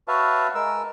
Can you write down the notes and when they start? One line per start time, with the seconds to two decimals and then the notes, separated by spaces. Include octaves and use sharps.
0.08 F#4 B4 C#5 E5 F5 A5
0.55 G#3 A#4 E6